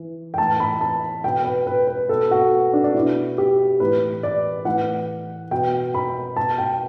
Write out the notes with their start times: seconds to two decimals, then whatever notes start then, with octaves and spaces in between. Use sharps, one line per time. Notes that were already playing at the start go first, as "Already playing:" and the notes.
Already playing: E3
0.34 G5
0.38 A2 E3 A5
0.60 B5
0.81 A5
1.24 B2 G5
1.45 B4
1.67 B4
1.88 B4
2.09 B2 A4
2.31 F#4
2.73 D4
2.84 D4
2.94 B2 E4
3.38 G4
3.80 A2 E3 B4
4.23 D5
4.65 A2 E3 F#5
5.51 B2 G5
5.94 B5
6.36 B2 A5
6.58 G5